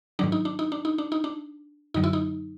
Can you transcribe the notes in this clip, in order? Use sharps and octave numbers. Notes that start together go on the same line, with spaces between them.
G#2 D#3 F#3 D4
D#4
D4
D#4
D4
D#4
D4
D#4
D4
F#2 D3 F#3 D#4
E4
D#4